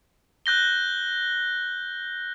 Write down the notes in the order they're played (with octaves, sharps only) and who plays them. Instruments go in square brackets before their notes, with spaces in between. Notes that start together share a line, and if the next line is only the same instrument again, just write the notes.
[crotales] F#6 G6 A#6 G7